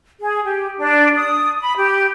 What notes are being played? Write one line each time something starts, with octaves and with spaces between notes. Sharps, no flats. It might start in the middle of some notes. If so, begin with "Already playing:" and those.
G#4
G4
D4
D#6
B5
G4